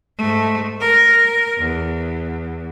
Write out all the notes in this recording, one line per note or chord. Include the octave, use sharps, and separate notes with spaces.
G#2 A3
A#4
E2